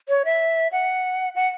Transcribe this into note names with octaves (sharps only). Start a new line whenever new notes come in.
C#5
E5
F#5
F#5